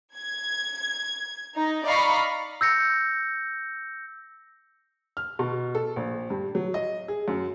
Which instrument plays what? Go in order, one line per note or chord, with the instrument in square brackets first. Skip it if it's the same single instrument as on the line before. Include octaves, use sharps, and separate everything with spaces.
[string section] G#6
D#4
D5 D#5 F5 A#5 B5 C#6
[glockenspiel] E6 G6 A#6 C#7
[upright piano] F6
B2
A4
A#1
G2
F#3
D#5
G#4
F#2